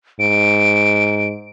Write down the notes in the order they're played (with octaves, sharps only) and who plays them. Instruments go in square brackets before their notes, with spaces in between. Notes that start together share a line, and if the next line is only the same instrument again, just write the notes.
[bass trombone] G#2 [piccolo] D7